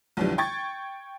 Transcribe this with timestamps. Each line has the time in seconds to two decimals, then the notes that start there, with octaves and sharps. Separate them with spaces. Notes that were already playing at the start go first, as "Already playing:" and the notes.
0.17 B1 F2 D3 E3 G3
0.38 G5 C#6 G#6 A6